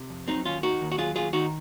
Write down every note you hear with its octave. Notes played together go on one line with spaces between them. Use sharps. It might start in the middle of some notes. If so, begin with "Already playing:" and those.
Already playing: C3
F2
F#3 C4 D#4
D#2 C#4 F4
D#3 D#4 F#4
D#2
F#4
F#3 F4 G#4
D#2 F4 G#4
D#3 D#4 F#4